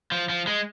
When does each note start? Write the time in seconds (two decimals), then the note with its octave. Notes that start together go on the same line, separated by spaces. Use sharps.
0.12 F3
0.29 F3
0.47 G#3